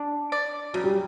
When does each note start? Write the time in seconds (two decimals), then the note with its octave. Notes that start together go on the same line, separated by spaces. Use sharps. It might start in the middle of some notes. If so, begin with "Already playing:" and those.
Already playing: D4
0.32 D5
0.74 C#3 F#3
0.84 G3